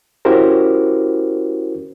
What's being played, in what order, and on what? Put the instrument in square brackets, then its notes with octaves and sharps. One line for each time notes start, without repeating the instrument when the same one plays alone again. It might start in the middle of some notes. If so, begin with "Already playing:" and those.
[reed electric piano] C#4 E4 F#4 G4 A#4 C5